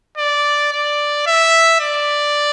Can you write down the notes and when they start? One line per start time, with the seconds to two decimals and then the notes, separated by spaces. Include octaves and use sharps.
0.18 D5
0.73 D5
1.27 E5
1.81 D5